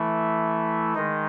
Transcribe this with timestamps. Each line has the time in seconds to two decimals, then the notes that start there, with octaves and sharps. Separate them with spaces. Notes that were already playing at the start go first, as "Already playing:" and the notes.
Already playing: E3 A3 E4
0.95 D#3 G#3 D#4